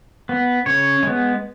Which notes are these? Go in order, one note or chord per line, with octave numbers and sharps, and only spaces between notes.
B3
C#3 C#5
G#3 B3